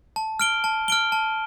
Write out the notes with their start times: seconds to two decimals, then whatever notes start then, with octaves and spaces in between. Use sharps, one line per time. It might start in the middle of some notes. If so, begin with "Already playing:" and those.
0.16 A5
0.40 F6 D7 G7
0.64 A5
0.88 F6 D7 G7
1.12 A5